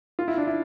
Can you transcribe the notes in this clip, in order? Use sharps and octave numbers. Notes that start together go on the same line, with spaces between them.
F4
E4
D4
E4